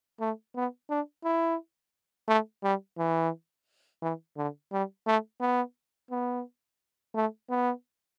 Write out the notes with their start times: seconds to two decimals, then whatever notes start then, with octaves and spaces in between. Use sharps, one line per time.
0.21 A3
0.55 B3
0.90 D4
1.24 E4
2.28 A3
2.63 G3
2.98 E3
4.02 E3
4.37 D3
4.72 G3
5.07 A3
5.41 B3
6.11 B3
7.15 A3
7.50 B3